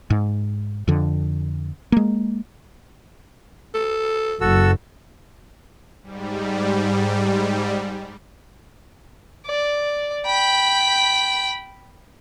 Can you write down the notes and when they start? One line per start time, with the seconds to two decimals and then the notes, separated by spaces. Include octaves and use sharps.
0.10 G#2
0.88 F2 D3
1.92 G#3 A#3
3.74 A4
4.41 F#1 F#4 A4 E6
6.03 G#2 G3
9.46 D5
10.26 G5 B5